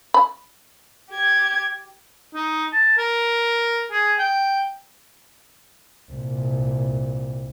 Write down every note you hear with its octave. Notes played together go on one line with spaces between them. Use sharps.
B5
G4 G#6
D#4
A5
A#4
G#4
G5
C2 A#2